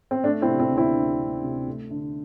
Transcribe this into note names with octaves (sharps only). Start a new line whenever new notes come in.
C4
A3 D4
C4 E4
C3
C4 E4
D2
C4 E4
D2
A3
C3
A3
D3